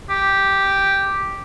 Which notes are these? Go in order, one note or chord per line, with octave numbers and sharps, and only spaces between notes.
G4